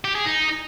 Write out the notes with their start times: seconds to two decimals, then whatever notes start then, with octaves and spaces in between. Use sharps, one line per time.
0.04 G4
0.15 G#4
0.26 D#4